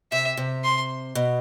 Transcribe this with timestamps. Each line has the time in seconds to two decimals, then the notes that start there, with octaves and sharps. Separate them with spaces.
0.12 C3 E5
0.37 C3
0.64 C6
1.15 B2